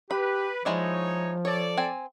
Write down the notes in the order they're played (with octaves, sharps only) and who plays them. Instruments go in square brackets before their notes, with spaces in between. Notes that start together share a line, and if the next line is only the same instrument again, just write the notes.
[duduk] G4 [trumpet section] B4 [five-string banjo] B5
[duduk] F3 [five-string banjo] G#3 E4 D5 [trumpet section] D#4 C#5
[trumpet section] A4 D5 [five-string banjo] C#5
[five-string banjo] C4 G#5